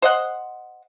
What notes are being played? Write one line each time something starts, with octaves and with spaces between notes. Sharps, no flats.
C5 D#5 F#5